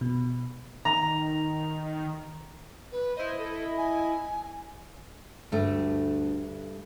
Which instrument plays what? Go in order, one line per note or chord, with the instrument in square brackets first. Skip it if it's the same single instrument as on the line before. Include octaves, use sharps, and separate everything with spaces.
[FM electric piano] B2
[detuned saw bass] D#3 [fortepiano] A#5
[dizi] B4
[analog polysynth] E4 D#5 [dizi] C5
[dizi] A4
G#5
[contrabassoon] D2 [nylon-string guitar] G2 A3